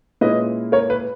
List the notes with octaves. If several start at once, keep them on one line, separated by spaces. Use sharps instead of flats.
A#2 G#3 C#4 E4 B4 D#5
A#4 C#5
B4